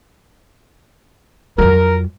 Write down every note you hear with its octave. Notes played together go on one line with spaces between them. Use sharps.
F2 F#3 A#4